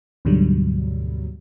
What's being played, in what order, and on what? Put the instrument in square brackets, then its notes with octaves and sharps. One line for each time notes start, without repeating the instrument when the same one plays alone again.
[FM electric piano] D2 G#2 B2 D3 F#3 G3